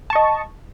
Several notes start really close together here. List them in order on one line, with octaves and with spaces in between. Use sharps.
A5 C#6 D#5